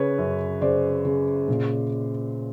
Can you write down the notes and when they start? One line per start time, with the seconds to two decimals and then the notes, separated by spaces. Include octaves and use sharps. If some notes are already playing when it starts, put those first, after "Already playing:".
Already playing: C#3 B4 C#5
0.18 F#2
0.61 C#3 C5 D5
1.05 C#3
1.48 A#2